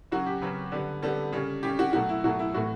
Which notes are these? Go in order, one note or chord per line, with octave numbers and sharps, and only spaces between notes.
C#3 F#3 C#4 F#4
G4
C#3 F#3 C#4 B4
D3 G3 B3
D3 G3 B3 A4
C#3 G3 C#4
C#3 G3 C#4 G4
F#4
B2 F#3 A3 F#4
E4
B2 F#3 A3 F#4
E4
A2 E3 A3 F#4